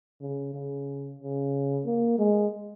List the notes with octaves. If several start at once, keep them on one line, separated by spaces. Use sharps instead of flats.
C#3
C#3
C#3
A#3
G#3